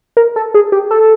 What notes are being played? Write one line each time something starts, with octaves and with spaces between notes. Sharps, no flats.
A#4
A4
G#4
G4
A4